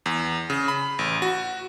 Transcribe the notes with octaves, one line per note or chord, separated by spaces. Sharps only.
E2
C#3
B5
A1
F#4